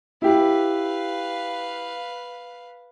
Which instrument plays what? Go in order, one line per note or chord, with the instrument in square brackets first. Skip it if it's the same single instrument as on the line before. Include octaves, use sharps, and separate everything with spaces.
[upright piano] E4 G4 [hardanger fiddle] B4 F5